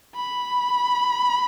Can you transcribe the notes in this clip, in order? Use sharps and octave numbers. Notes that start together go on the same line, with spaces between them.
B5